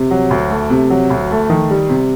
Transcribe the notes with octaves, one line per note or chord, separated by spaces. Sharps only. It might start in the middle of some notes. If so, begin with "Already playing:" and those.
Already playing: C3
F#3
D2
A3
C3
F#3
D2
A3
D#3
G3
C3